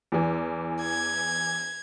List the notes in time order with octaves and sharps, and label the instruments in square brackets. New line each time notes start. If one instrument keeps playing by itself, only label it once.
[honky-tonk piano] E2 E3
[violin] G#6